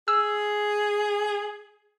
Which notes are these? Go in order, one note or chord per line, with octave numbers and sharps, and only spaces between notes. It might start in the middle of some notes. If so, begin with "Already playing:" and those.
G#4 E6